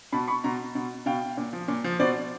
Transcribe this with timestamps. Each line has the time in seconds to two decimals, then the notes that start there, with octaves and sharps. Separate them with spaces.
0.12 B2 A5 B5
0.28 B5 C#6
0.44 B2 A#5 C6
0.75 B2
1.06 B2 F5 G5
1.37 A#2
1.53 F3
1.68 A#2
1.84 F3
2.00 B2 C5 D5